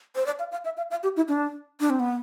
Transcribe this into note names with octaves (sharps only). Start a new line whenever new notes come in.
C5
D5
F5
F5
E5
F5
F5
G4
E4
D4
D4
C4
B3